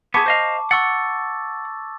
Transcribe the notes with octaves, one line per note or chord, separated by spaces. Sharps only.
B3 G#4 A5 C#6 D6
C5 D#5 F5
F#5 C#6 E6 A6